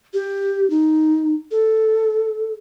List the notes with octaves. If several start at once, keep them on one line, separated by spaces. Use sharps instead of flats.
G4
D#4
A4